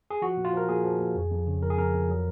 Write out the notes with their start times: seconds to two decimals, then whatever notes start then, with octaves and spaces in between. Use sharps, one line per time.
0.10 G#4
0.22 F3 F#4
0.37 A#2
0.45 F4
0.53 F3 A#4
0.69 A#2 G#4
0.84 F3
0.99 A#2
1.15 F2
1.32 F2
1.46 C#3
1.62 F3 A#4
1.70 G#4
1.78 F2 A#4
1.94 F2
2.09 F#3